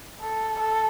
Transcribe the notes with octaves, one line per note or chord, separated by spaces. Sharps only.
A4
A4